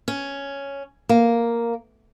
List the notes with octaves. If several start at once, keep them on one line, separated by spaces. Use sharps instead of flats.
C#4
A#3